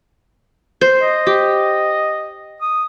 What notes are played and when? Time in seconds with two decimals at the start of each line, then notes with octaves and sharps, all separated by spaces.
0.81 C5
1.03 D#5
1.27 G4
2.61 D#6